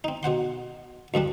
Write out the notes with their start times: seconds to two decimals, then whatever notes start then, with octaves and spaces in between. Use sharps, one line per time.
0.04 C4 D#4
0.23 B2 C5 F#5 C6
1.14 D2 G2 G3 D4